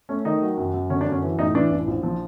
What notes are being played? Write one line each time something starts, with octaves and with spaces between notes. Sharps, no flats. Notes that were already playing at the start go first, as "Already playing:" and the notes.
A3 C#4
D#3 D#4
F#3
F#2
F#2
D3 C#4
D4
F#2
C#4
E3
A2 D#4
E3 D4
A1
A#1
F3